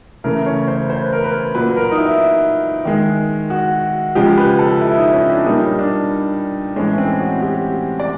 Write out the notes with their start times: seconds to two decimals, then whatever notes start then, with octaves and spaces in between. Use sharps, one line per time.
0.24 C#3 E3 A3 A#4
0.46 C#5
0.68 C5
0.90 C5
1.01 B4
1.13 A#4
1.24 B4
1.54 A#2 F#3 A#3 B4
1.76 A#4
1.91 D#4
1.98 E4
2.85 D#3 G#3
3.50 F#4
4.15 C#3 F3 G#3 G4
4.38 B4
4.59 A4
4.81 E4
4.97 D#4
5.13 C#4
5.30 D4
5.46 A#2 G3 A#3 D#4
5.79 D4
6.76 A2 E3 G#3 C#4
6.98 C4
7.20 F#4
7.42 G4
8.00 D5